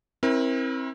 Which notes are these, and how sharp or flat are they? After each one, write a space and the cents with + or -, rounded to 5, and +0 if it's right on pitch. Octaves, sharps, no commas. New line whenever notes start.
C4 +30 E4 -20 A#4 +30